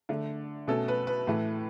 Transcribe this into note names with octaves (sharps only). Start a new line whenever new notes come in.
D3 A3 D4
B2 A3 C#4 A4
B4
B4
A2 E3 A3